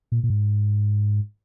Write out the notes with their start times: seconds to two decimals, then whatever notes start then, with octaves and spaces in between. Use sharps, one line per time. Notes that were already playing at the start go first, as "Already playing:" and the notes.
0.12 A#2
0.24 A#2
0.30 G#2